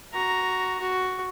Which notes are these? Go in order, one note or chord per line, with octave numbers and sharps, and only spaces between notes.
F#4 A#5
F#4